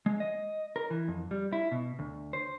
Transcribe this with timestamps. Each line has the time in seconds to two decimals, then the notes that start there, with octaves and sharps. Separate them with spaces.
0.06 G#3
0.20 D#5
0.76 A#4
0.90 E3
1.08 F2
1.31 G3
1.53 E4
1.71 B2
1.99 D2
2.33 C5